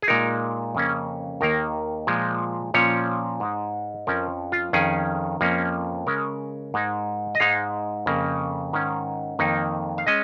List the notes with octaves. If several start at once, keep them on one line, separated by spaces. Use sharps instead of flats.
G#4
A#2 G#3 D#4 A#4
F2 C#3 A#3 C#4
D#2 D#3 A#3 A#4
A#2 F3 G#3
A#2 F3 C#4 C#5
G#2 G#3 D#4
F2 F3 C#4 A#4
F4
F2 D#3 C#4 G#4
F2 F3 A#3 C#4
C#3 G#3 C#4 A#4
G#2 G#3 D#4
D#5
G#2 G#3 D#4 F5
F2 C#3 A#3
G#2 D#3 C#4
F2 D#3 A#3 D#4
F5
G#3 C#4 D#5